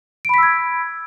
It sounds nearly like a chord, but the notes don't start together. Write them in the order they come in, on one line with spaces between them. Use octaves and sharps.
D7 B5 B6 E6 G#6